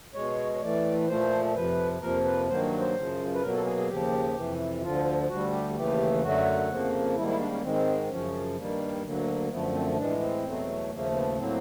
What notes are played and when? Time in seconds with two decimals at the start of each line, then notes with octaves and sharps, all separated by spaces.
0.14 B2 G#3 C#5
0.55 C#5
0.62 A2 E3 A3 D5
1.08 A#2 F3 A3 C5
1.55 F2 C3 F3 B4
2.01 F2 C3 F3 A#3 A#4
2.25 B4
2.48 G2 D#3 F#3 A#3 C5
2.80 C5
2.95 F#2 C#3 F3
3.35 B4
3.41 B2 F#3 A#3 A#4
3.54 A4
3.65 G#4
3.78 G#4
3.88 D#2 C#3 F3 G4
4.35 F2 C3 E3
4.82 D2 D3 F3 F4
5.29 D2 D3 G3 F#4
5.52 G4
5.75 D#2 C#3 E3 A3 G4
6.22 F#2 D3 F#3 A3 F#4
6.69 F2 C#3 F3 A#3
7.16 G#2 D#3 G3 A#3 E4
7.28 E4
7.39 D4
7.52 C#4
7.63 G#2 D#3 G#3 C4
8.09 F#2 C#3 F3 C#4
8.56 G2 D#3 G3 A#3
9.02 D2 D3 F#3 A#3
9.50 F#2 D3 F3 A3 B3
9.73 C4
9.96 A2 E3 G#3 D4
10.20 C4
10.43 E2 B2 F#3 A3
10.90 D#2 C#3 F3 A3 A#3
11.13 B3
11.36 A2 F#3 A#3 C4